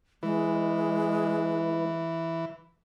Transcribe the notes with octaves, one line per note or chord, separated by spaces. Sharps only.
E3 G#3 E4 B4